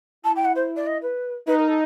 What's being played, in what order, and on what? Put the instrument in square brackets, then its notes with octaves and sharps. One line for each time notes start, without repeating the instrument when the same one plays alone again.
[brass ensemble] E4 [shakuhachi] A5
[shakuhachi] G5
F#5
C5
D5
D#5
B4
[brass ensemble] D#4 [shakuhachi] B4
[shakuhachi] A#4
A4